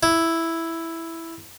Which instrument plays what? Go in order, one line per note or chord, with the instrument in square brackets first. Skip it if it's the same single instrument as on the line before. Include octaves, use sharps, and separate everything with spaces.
[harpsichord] E4